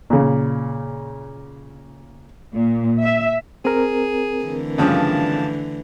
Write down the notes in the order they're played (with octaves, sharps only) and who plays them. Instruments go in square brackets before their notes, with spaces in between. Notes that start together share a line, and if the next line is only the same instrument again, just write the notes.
[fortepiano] A#2 C#3
[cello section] A#2
E5
[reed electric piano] C4 A#4 [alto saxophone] G#4
[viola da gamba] D3 E3 A3
[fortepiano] G2 C#3 F3 [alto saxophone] A5